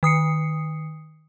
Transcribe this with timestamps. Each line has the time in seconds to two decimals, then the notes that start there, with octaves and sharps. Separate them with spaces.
0.03 D#3 D#6 C7 C#7